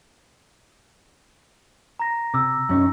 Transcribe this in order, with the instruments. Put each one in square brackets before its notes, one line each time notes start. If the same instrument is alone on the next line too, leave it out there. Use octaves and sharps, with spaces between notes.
[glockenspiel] A#5 A#6
[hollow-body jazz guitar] C3 [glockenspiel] D6 E6
[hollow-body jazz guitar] F#2 C#4 D#4